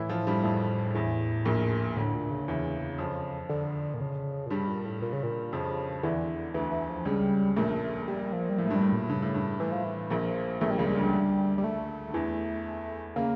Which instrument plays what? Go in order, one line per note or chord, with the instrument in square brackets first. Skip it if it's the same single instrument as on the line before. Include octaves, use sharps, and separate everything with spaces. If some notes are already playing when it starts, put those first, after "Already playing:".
Already playing: [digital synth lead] A2 [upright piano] E3 E4
[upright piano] F3 F4
G2 G3
[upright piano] F2 F3 [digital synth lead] A2
[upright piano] E2 E3
A#1 A#2
[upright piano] D2 D3 [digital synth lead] A2
[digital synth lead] A#2
C#3
[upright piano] E2 E3
F2 F3
[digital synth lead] D3
A#2
C#3
A#2
[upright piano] G2 G3 [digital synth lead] C#3
[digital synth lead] A#2
A2
A#2
C#3
A#2
[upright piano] F2 F3 [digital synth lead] C#3
[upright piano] E2 E3 [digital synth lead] D3
[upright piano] D2 D3 [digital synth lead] E3
[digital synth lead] E3
F3
[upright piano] C#2 C#3 [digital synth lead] G3
[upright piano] A#1 A#2 [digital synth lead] A3
[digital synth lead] G3
F3
G3
[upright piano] A2 [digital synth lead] F3
[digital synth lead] A3
[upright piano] G2 [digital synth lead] G3
[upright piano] A2
[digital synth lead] A#2
[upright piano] G2 [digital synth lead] C#3
[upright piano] A2
G2
[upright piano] A2 [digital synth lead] E3
[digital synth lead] F3
E3
[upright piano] A#1 A#2 [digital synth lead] F3
[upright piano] A#1 A#2 [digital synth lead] A3
[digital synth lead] G3
[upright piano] C#2 C#3 [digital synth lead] F3
[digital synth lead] G3
[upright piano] D2 D3
[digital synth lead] G3
A3
[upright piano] D3
E2 E3
[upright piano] C#3 [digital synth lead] A#3